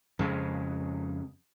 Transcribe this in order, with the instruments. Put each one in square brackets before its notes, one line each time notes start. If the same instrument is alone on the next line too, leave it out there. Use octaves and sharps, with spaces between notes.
[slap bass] F2 C#3 G#3